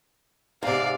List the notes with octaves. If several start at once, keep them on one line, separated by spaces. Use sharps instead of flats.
G#2 C3 D5 F5